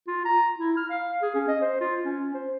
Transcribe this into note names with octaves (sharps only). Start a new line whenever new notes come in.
F4
A#5
E4
F6
F5
G#4
C#4
D#5
C5
F4
C#4
C5